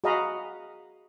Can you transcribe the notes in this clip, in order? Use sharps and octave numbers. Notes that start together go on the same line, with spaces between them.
F#4 G#4 D#5 F5 A#5 B5